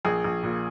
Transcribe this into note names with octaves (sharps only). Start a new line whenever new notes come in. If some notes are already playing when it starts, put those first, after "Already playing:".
A#1 G#4
A#1
A#2